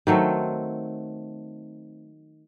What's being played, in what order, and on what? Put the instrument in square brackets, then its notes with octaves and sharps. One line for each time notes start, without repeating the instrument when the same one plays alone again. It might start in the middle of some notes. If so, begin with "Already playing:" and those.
[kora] D#3 F#3 A3 C4